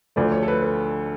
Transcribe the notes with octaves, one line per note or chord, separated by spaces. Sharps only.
D2 D3 F3 A3 D5
C#5
A4
B4
B4